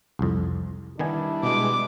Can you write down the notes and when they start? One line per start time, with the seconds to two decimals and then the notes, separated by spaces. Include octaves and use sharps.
0.19 C2 F2
0.99 D#3 G3 B3 D4 E4 G#5
1.43 B2 G#3 D6